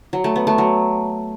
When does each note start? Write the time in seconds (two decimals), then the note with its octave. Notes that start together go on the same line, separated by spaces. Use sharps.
0.13 F#3
0.24 A3
0.36 B3
0.47 A3
0.58 F#3